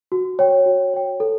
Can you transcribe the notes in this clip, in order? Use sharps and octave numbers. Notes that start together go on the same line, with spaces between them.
F#4
C#5 G5
F#4
C#5 G5
A4